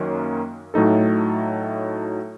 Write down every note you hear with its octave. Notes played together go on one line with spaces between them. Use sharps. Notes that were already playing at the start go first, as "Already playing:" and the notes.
Already playing: F#2 D#3 A#3 C#4
A2 F#3 A3 D#4 A4